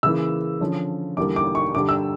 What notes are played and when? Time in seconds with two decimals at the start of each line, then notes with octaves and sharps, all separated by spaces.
0.03 C#3 E3 A#3 E6
0.61 D3 F3 C#4
1.17 E2 D3 G3 A#3 D6
1.36 D6
1.55 C#6
1.74 G2 D3 G3 D6
1.89 E6